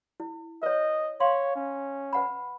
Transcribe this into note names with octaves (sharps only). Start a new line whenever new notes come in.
E4
B4 C#5 D#5
C#5 F5 C6
C#4
B4 F#5 B5